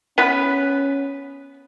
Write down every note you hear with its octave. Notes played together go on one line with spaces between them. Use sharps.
B3 C#4 B4